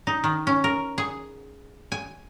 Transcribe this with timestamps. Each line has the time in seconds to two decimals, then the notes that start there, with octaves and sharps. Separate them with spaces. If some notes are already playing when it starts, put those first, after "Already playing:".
0.07 D#4
0.24 D#3
0.47 C#4
0.64 A#4
0.98 G#4
1.92 G#5